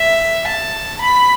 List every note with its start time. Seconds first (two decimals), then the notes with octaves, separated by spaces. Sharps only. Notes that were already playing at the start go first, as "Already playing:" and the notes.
Already playing: E5
0.47 A5
1.01 B5